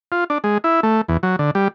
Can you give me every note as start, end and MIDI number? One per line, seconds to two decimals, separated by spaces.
0.12 0.24 65
0.30 0.38 62
0.44 0.58 56
0.64 0.80 64
0.83 1.01 57
1.08 1.17 40
1.23 1.36 54
1.39 1.51 50
1.55 1.68 55